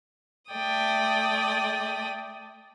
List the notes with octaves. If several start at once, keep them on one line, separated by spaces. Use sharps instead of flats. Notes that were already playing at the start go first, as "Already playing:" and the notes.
A3 D5 G5 D#6